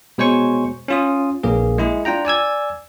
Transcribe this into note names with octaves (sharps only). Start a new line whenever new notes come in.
B2 G#3 C5 C#5 G#5 C#6
C#4 F4 D#6
A#1 A#3 G#4
G#3 E4 G#4
D4 F4 G5 A#5
D5 G#5 E6 G#6